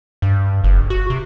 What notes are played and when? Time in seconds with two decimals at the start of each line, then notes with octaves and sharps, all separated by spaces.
0.22 G2
0.64 F#1
0.90 F#4
1.10 C3